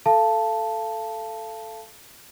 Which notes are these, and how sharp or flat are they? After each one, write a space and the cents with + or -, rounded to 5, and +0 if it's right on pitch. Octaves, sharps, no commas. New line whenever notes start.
A4 +0 F5 -30 A5 +0